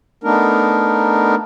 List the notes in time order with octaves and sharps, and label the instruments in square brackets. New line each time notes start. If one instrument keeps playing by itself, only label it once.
[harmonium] A3 B3 D4 D#4 A#4